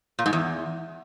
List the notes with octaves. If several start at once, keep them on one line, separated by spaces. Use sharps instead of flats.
A#2
G#2
E2